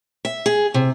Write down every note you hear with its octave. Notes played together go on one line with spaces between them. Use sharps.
E5
G#4
C3